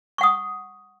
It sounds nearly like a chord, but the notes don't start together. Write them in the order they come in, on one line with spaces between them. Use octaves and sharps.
C#6 F#5 D#6